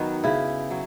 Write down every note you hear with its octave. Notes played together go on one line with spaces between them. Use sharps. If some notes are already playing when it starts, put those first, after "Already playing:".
Already playing: D#3 F#3 B3 F#4
C#3 E4
F#3